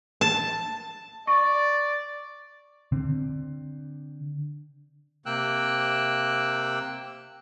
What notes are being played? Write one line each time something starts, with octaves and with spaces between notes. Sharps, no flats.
A5
D5 C#6
D3 C4
C3 A#3 G5 E6 F#6